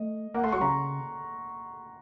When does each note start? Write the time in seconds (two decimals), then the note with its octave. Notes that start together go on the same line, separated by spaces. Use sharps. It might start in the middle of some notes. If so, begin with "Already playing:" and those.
Already playing: A3 D#5
0.35 A#3 F#5
0.43 A3 C6
0.52 F#3 C#6
0.61 C#3 A#5